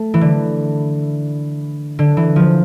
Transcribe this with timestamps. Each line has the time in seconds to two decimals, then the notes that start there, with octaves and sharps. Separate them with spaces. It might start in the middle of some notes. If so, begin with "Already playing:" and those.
Already playing: A3
0.14 E3
0.21 D3
1.99 D3
2.17 E3
2.36 F3